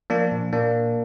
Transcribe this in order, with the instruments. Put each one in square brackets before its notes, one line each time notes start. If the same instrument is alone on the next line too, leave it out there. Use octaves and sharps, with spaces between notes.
[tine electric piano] F3 A#3 D4
A#2
A#2 A#3 D4